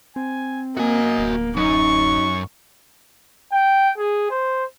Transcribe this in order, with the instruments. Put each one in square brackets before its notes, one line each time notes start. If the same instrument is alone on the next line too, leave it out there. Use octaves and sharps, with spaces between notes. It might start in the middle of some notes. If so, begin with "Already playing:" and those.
[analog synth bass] C4 [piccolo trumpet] G#5
[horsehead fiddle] A#3 [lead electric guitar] F#4 G#5 [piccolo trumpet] D#5
[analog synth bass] D1
[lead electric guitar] F#2 C#4 [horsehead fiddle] D#4 [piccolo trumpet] C#6
[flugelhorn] G5
G#4
C5